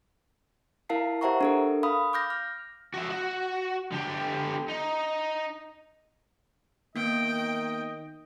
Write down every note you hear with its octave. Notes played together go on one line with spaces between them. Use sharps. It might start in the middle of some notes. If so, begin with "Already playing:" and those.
E4 A#4 F5 A5 C7
G4 C5 E5 F#5 A#5 C#6
D4 A4 A#4
F5 B5 D#6
D6 F6 G6 A#6
F6
F#4 E5
F#4
D3 G4
D#4
D#3 A#3 B3 D#5 G5